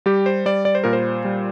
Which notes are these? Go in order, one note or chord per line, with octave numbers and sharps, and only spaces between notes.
G3 G4
C5
G3 D5
D5
C5
A#2 A#4
C5
G3